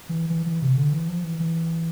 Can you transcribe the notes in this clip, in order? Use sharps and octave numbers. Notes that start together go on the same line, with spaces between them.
E3
E3
E3
C3
D3
E3
F3
E3
E3